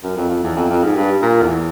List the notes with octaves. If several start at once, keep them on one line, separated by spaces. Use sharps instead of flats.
F#2
F2
F2
E2
F2
F2
G#2
G2
A#2
E2